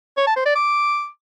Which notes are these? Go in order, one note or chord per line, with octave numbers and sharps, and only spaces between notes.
C#5
A5
C5
D5
D6